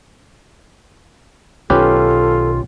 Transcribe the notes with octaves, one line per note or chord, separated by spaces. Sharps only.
B1 D#3 C#4 F4 G4 A4 B4